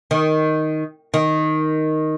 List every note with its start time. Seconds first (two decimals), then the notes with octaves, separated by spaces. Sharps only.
0.11 D#3
1.14 D#3